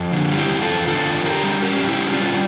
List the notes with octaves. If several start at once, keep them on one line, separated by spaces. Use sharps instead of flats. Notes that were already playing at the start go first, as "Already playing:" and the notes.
Already playing: F2
D3
G3
E4 G4
E2
F4 A4
E2
D3 F4 A4
E2
D3 G4 A#4
G3
C#4 G4 A#4
G3
E4 G4
C#4
D4 F4
G3